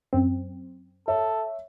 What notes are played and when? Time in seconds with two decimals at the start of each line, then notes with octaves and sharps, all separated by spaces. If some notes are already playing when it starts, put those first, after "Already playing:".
0.13 F#2 C4
1.08 A4 C#5 E5